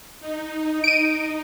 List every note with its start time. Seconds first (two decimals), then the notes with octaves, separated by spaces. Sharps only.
0.20 D#4
0.84 D7 D#7